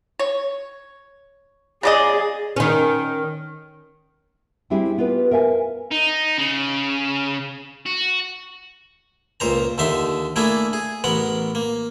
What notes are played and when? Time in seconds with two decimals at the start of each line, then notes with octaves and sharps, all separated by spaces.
0.19 C#5
1.83 C#3 G#4 D5 D#5
2.56 D#3 C#4
4.70 G3 C4 D4 E4 G4 G#4
4.98 B3 F4 G4 B4
5.31 A#4 E5 F5 G5 G#5
5.91 D#4
6.38 C#3
7.86 F#4
9.40 C#2 A#2 C5 A#5
9.78 D#2 D3 D#4 E5 C6
10.36 A3 A#3 D4 E4 G#4
10.73 G#4
11.04 A1 B3 A#4 F#5
11.55 A#3